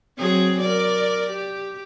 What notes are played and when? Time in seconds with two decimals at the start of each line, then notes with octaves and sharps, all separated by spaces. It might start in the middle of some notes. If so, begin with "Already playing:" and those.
0.18 F#3 C4 G#4
0.60 A#4 D5
1.30 G4